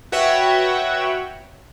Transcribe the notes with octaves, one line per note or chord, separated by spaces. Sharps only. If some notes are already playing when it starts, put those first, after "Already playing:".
F#4 B4 C#5 E5 F#5 G5